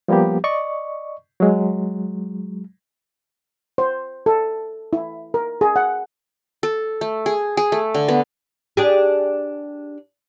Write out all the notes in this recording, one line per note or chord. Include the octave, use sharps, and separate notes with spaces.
F3 G3 A#3 B3 G4
D5 D#5 C#6
F#3 G#3
C5
A4
E4
A#4
G#4
F#5
A4
A3
G#4
G#4
A3
D3
B3
D4 G4 G#4